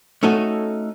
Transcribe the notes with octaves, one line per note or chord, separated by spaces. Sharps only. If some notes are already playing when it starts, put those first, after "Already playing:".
A3 C#4 D#4 F#4 A4